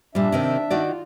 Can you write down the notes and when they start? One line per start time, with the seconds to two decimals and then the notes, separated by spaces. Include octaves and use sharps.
0.15 A#2 G3 D4 E5
0.32 C3 D#3 C4
0.70 D#3 F#4 D5
0.85 F4